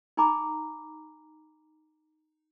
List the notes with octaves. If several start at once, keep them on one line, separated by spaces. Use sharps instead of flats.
D#4 G#5 A#5 B5 D6